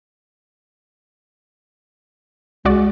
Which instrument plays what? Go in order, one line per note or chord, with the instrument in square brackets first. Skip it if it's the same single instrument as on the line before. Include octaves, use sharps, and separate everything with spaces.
[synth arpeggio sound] C#2 F#4 D5 [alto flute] G#3